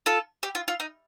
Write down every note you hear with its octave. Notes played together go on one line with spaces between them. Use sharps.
F4 A4
G4
F4
F4
D#4